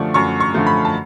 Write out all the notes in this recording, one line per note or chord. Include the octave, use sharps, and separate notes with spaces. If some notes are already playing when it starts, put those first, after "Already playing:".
Already playing: F#2 D3 F3 A3 D5 C#6
F#2 C#6
C#6
D3 F3 A3
B5
A5